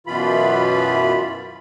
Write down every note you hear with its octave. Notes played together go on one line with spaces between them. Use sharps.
F#2 B2 E3 F4 B5